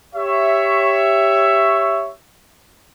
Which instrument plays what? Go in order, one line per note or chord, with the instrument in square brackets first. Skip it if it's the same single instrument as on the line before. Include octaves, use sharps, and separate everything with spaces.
[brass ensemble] G4 C#5 E5